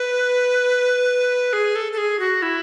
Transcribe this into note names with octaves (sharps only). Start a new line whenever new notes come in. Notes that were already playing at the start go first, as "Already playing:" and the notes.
Already playing: B4
G#4
A4
A4
G#4
F#4
E4